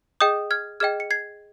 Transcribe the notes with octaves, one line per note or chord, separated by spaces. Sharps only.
G#4 D#5 G5 D#6 G6
F6 G#6
G#4 D#5 G5 F6 G#6
C#7
G#6 C7